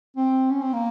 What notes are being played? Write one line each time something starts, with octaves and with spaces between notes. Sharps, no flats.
C4
C#4
C4
A#3